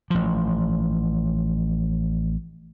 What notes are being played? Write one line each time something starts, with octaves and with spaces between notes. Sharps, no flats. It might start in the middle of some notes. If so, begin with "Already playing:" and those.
A1 F3